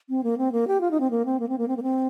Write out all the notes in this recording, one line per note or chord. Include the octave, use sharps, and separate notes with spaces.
C4
A#3
C4
A#3
G4
F4
D#4
C4
A#3
C4
A#3
C4
A#3
C4
A#3
C4